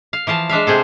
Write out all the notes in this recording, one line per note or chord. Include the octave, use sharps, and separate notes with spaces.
F5
E3 F3 F5 A5
G#3 D4 E5 F5
C3 C4 G#4 A4